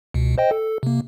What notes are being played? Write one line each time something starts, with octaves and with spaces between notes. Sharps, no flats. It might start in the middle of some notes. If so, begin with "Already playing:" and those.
C#2 B2
C5 D#5 G5
A4
C3 A#3